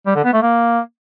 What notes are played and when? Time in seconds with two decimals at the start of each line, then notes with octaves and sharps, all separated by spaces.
0.07 G3
0.15 D3
0.24 B3
0.33 A3
0.42 A#3